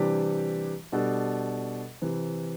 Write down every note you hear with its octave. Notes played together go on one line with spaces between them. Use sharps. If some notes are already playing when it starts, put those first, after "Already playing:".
Already playing: C3 E3 G3 D4 G4
B2 G3 D4 A4
C3 E3